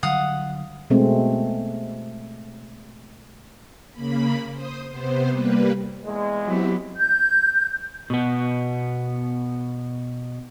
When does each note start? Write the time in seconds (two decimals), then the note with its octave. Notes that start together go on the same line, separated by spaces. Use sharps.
0.03 D3 F#3 G3 F5 F#5 D#6
0.90 B2 G#3 A3 C4
3.92 C#3 A#3 B5
4.52 C5 D#6
4.88 C3 B3 C5
5.30 G3 A#3 B4
6.05 E2 G#3
6.44 F#3 B3 C4 E4 G4
6.97 G6
8.10 B2 B3